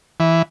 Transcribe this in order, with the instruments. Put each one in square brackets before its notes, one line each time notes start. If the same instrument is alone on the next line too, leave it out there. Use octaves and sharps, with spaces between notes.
[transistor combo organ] E3